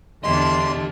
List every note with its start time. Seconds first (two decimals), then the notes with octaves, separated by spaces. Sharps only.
0.24 E2 D3 D4 G4 D#5 C6